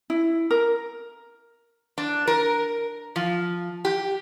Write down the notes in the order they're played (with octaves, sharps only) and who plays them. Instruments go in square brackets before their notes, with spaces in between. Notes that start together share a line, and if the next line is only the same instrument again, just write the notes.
[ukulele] E4
A#4
[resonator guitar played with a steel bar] D4
A#4
F3
G4